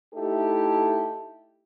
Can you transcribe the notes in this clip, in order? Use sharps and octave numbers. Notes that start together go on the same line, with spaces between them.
A3 D#4 E4 G4 A4